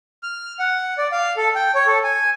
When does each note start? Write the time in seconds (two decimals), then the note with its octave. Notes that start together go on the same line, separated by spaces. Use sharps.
0.23 F6
0.59 F#5
0.98 D5
1.12 F5
1.37 A4
1.55 G5
1.75 C#5
1.87 A4
2.04 G#5